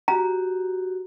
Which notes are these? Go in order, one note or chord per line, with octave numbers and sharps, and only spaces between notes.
F#4 G4 A#5